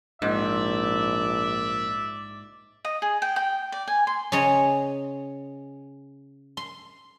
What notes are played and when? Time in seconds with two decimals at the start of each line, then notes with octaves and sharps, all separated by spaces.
0.22 A#1 G#2 D5 E5
2.85 D#5
3.02 G#4
3.22 G5
3.36 G5
3.72 D5
3.88 G#5
4.07 C6
4.32 C#3 G#4 C#5 D#5 A#5
6.57 C6